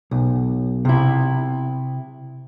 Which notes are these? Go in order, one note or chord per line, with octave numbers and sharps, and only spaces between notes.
B1
C3 E4